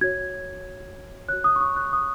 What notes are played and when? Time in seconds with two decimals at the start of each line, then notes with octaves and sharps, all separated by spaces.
0.01 F#4 C#5 G#6
1.28 C#5 F#6
1.33 F#4
1.44 D#6
1.56 C#6
1.61 D#6
1.76 F#6
1.93 D#6